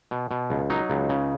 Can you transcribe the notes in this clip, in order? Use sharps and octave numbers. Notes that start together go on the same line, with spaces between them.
B2
B2
C#2
F#3 D#4
C#2
C#3